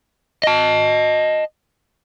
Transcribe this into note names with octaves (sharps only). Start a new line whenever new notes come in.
D#5 A5